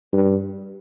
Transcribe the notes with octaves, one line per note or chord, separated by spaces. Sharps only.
G2